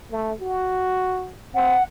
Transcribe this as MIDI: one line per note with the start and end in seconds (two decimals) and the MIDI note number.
0.11 0.33 57
0.41 1.32 66
1.55 1.75 60
1.55 1.83 78